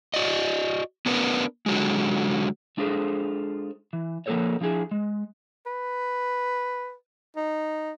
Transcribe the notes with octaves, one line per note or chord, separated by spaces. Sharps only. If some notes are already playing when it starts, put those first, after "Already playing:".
F#4 D5 D#5
B3 D4 A#4 B4
D3 F#3 G#3
G#3 D4 F4 G#4 A4 C5
E3
F3 A#3 C#4 A4 C#5 D5
F3 D4 E4 G#4
G#3
B4
D#4